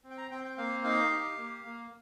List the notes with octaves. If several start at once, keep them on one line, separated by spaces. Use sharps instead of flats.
C4
G5
A#5
C4 G5
G5
A#3 F5
D#4 F5
G4
A#3
A#3